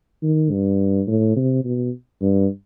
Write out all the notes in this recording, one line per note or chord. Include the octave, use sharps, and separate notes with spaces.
D#3
G2
A2
C3
B2
G2